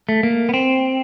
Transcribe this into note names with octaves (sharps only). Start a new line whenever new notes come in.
A3
A#3
B3
C4